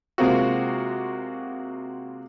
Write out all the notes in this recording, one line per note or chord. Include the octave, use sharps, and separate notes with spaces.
C3 G#3 A#3 C4 F4 F#4